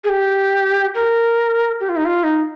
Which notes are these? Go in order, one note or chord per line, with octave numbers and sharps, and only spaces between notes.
G#4
G4
A#4
G4
F4
D#4
F4
D#4